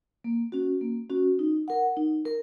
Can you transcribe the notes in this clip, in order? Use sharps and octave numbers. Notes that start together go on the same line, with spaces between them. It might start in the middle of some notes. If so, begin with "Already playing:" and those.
A#3
C#4 F#4
A#3
C#4 F#4
D#4
A#4 F#5
D#4
A#4